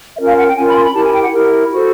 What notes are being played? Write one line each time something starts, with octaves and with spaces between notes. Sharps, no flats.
C#4 F4 A#4 E5
F5
F#5
G5
C#4 F4 A#4 G#5
B5
C6
B5
E4 G4 A#4 A5
G#5
G5
F#5
E4 G4 A#4
F#4 A4 C5